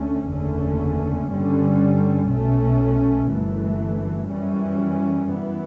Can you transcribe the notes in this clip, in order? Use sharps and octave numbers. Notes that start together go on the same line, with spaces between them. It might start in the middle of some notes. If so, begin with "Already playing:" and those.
Already playing: D2 D3 A3 C#4
F#1 E2 D3 A3 C#4
G2 D3 G3 C#4
B1 B2 A3 C#4
G1 F#2 E3 A3
F#2 E3 G3 C#4
F#2 E3 B3